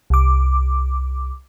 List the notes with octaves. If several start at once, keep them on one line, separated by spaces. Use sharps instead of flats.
C2 D6